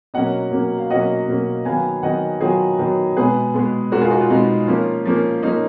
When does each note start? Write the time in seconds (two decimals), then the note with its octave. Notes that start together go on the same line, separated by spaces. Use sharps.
0.14 B2 F#3 A#3 C#4 D#5 F#5
0.51 B2 F#3 A#3 C#4
0.78 F5
0.90 B2 F#3 A#3 C#4 D#5 F#5
1.27 B2 F#3 A#3 C#4
1.65 D#3 F#3 B3 F5 G#5
2.03 D#3 F#3 B3 D#5 F#5
2.40 D#3 F#3 B3 F4 G#4
2.78 D#3 F#3 B3
3.16 B2 G#3 B3 G#4 B4
3.54 B2 G#3 B3
3.92 B2 G#3 B3 F#4 A#4
4.01 F4 G#4
4.11 D#4 F#4
4.20 F4
4.30 B2 G#3 B3 D#4
4.67 F3 A#3 C#4 F4
5.05 F3 A#3 C#4
5.43 F3 A#3 C#4 D#4